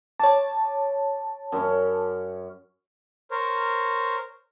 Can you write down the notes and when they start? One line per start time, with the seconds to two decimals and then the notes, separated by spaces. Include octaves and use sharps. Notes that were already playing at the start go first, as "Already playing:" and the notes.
0.20 C#5 A5 D6
1.52 F#2 C#4
3.31 A#4 C5 C#5